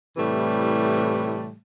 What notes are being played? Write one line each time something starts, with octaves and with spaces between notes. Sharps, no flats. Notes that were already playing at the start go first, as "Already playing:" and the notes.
A2 C3 E3 G3 A3